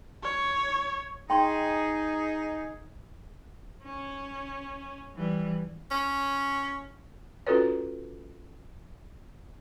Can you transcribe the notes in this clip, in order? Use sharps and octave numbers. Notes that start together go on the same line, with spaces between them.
C#5
D#4 G#4 G5 C6 C#6
C#4
E3 G3
C#4
C#4 F4 F#4 A4 B4 C#5